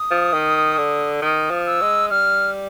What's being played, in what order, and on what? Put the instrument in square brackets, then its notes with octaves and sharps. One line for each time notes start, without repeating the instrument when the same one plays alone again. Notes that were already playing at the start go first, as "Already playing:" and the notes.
Already playing: [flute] D#6
[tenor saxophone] F3
D#3
D3
[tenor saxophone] D#3 [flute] D#6
[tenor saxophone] F3
[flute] E6
[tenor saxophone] G#3
[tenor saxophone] G3 [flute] F6